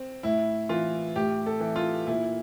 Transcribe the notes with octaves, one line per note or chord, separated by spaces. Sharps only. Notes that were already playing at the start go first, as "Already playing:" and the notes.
Already playing: C4
A2 E4
E3 F4
A2 G4
A4
E3
F4
A#2 E4